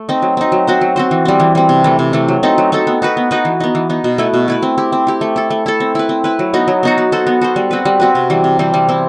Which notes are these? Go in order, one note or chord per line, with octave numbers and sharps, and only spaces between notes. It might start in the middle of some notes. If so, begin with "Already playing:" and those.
Already playing: A3
C4 D#4
F#3
C4 D#4
F#3
C4 F#4 C5
F#3
C4 F#4 C5
E3
G3 C4
E3
G3 C4
C3
E3 A3
C3
E3 A3
F#3
C4 D#4 A4
F#3
C4 D#4 A4
B3
D#4 F#4 B4
B3
D#4 F#4 B4
E3
B3 D#4
E3
B3 D#4
B2
A3 E4 B4
B2
A3 E4 B4
C4
E4 G4
C4
E4 G4
A3
E4 A4
A3
E4 A4
C4
E4 B4
C4
E4 B4
F#3
B3 D#4 F#4
F#3
B3 D#4 F#4
B3
F#4 A4 C5
B3
F#4 A4 C5
G3
C4 F#4 B4
G3
C4 F#4 B4
C3
E3 G3 C4
C3
E3 G3 C4
G3
C4 E4